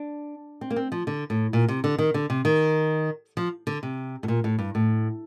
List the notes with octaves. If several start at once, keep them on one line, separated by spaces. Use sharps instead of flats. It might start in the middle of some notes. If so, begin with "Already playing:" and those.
Already playing: D4
C4
A#3
C4
F3
D3
A2
A#2
C3
D3
D#3
D3
C3
D#3
F3
D3
C3
A2
A#2
A2
G2
A2